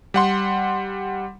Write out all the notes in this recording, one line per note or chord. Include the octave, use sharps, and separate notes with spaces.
G3 F#5 C6